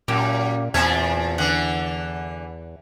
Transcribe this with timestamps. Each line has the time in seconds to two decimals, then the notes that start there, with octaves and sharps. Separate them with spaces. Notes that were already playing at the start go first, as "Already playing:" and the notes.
0.08 F#2 A#2 A#3 G4
0.74 E2 A#2 C4 E5 G#5 A5
1.38 D3 E3 F#5